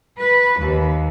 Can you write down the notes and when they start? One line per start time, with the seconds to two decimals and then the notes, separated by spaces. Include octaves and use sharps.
0.17 B4
0.58 D#2